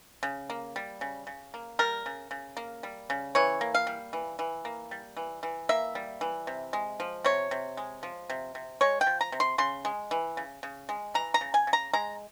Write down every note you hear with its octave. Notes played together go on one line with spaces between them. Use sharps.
C#3
A#3
G3
C#3
C#3
A#3
G3 A#4
C#3
C#3
A#3
G3
C#3
E3 C#5
A#3
F5
G3
E3
E3
A#3
G3
E3
E3
A#3 E5
G3
E3
C3
G#3
F3
C3 C#5
C3
G#3
F3
C3
C3
G#3 C#5
G5
F3
A#5
C3
C6
C#3 C6
G#3
E3
C#3
C#3
G#3
E3 A#5
A#5
C#3
G#5
C#3
A#5
G#3 A#5